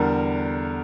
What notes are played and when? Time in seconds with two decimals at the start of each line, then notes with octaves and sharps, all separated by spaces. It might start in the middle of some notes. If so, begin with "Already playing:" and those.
Already playing: E2 D3 G3 A#4